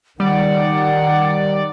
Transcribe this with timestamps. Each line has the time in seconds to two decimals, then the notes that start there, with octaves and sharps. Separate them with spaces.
0.20 D#3 G3 D5 F#5